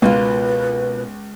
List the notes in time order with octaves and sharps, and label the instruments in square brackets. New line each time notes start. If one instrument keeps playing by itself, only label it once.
[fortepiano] C#2 [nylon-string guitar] B2 A#3 F4 [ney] B4